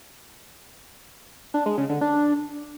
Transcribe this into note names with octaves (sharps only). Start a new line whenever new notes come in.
D4
G#3
C#3
D3
D4